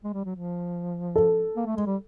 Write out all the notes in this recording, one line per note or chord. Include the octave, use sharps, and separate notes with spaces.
G#3
G3
F#3
F3
A4
A#3
A3
G#3
G3